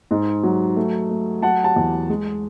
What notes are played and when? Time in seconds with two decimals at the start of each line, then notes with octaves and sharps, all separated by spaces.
0.11 G#2
0.43 F#3
0.76 A3
1.10 A3
1.42 F#3 F#5 A5
1.64 F#5 A5
1.76 E2
2.10 G#3